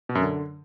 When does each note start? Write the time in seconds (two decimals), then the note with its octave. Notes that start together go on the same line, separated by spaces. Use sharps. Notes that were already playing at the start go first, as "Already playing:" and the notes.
0.09 B2
0.15 F#2
0.21 D3